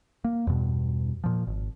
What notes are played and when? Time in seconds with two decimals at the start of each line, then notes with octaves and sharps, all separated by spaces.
0.25 A#3
0.47 E2 G2 B2
1.24 A#2 F3
1.47 G#1